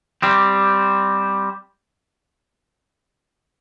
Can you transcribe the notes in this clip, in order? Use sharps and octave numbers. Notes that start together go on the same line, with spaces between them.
G3 C4 G4